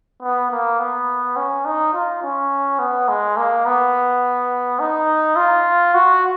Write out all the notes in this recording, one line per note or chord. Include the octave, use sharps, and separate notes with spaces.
B3
A#3
B3
C#4
D#4
F4
C#4
B3
G#3
A#3
B3
D#4
F4
F#4